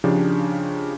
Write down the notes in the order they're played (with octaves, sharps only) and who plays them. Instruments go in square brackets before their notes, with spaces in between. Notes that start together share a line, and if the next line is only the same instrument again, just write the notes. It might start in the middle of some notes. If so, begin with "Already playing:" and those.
[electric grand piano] C#3 F3 D4 D#4 G4